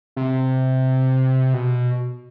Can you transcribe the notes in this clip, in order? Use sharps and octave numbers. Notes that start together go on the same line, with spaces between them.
C3
B2